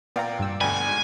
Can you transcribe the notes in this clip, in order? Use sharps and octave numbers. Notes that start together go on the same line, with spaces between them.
A#2 B3 D5 F5 G5 A#5
G2 E6
D2 B2 D3 D5 G5 G#5 B5
G#2